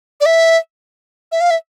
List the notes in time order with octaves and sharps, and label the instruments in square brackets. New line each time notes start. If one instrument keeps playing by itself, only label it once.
[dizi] D5
E5
E5
F5
E5